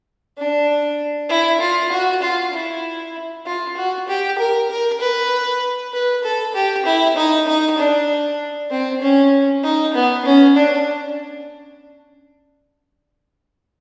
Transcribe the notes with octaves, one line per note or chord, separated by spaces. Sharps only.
D4
E4
F4
F#4
F4
E4
F4
F#4
G4
A#4
A#4
B4
B4
A4
G4
E4
D#4
D#4
D4
C4
C#4
D#4
B3
C#4
D4